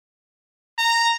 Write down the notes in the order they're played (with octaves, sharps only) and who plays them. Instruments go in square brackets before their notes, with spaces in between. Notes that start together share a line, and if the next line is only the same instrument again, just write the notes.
[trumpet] A#5